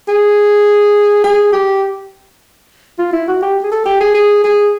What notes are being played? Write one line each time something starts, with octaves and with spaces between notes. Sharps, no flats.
G#4
G#4
G4
F4
E4
F#4
G4
G#4
A4
G4
G#4
G#4
G#4